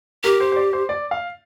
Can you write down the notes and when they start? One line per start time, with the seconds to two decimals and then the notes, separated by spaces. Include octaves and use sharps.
0.24 G4 A#4
0.40 C5
0.52 C5
0.56 D5
0.73 C5
0.89 D5
1.11 F5